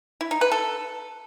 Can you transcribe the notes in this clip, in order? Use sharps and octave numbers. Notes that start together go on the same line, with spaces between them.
E4
D#4
B4
A4